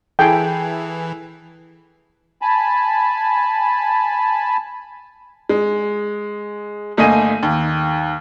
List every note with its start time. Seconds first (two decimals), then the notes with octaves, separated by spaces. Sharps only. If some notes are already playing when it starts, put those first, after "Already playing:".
0.19 E3 E4 G#4 A4 G5
2.42 G#5 A5 B5
5.49 G#3
6.97 G1 A3 A#3 D#5 G#5 D#7
7.43 D#2